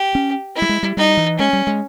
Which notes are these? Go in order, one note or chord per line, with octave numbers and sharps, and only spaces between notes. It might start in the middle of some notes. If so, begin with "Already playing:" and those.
Already playing: G4
C#4
E4
G3
G#3
G3
G3 D#4
E3
G#3 C#4
G3
G#3